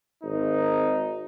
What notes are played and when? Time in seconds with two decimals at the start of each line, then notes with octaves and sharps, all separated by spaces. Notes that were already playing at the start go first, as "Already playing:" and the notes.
0.23 G#1 D#4